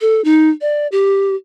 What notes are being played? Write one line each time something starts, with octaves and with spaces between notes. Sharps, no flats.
A4
D#4
D5
G4